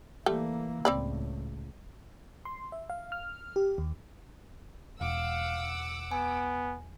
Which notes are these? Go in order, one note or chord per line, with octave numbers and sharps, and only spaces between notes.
E3 G3 A3 A#3
C#2 A2 C4 D5 B5
C6
E5
F5
F6
G4
D#2
E1 F5 F#5 D6 E6
B3 G#5